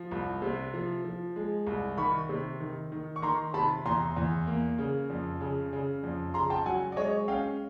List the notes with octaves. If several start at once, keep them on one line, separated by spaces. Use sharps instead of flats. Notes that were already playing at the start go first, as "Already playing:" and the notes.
Already playing: F3
C2
C3
F3
F3
G#3
C2
D#3 B5 C#6
C3
D#3
D#3
C#6
D#3 A#5 C6
C3 A5 B5
E2 A#5 C6
E2
A#3
C#3
F2
C#3
C#3
F2
C#3 A#5 C6
G5 A5
F#3 F#5 G#5
D5
G#3 C#5 D#5
C#4 F5 G5